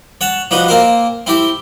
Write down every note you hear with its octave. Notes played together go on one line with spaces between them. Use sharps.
C#5 F#5 A5
F3 D4 D#4 F#4 B4
A#3 C4 A#4 C5
C4 E4 G4 G5